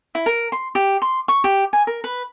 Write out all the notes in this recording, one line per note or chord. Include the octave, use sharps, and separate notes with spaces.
E4
A#4
C6
G4
C6
C#6
G4
G#5
A#4
B4